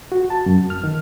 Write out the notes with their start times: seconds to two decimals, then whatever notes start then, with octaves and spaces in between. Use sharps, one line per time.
0.12 F#4
0.30 A5
0.46 F#2
0.70 F6
0.84 D#3